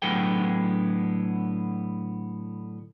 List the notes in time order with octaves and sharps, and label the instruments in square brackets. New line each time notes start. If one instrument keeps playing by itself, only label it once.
[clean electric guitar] A2 D3 F#3 B3 G#4 G5